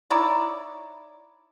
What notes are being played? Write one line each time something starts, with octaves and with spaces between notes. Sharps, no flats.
D#4 E4 C#5 D5